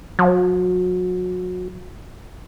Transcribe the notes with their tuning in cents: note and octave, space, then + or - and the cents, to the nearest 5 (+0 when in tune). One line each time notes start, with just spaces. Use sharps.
F#3 -30